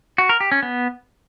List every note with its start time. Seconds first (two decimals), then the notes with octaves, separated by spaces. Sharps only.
0.18 F#4
0.29 A#4
0.40 G4
0.52 C#4
0.63 B3